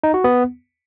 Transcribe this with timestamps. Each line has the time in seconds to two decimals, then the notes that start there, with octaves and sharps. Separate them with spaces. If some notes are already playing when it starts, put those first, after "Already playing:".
0.03 D#4
0.14 F#4
0.24 B3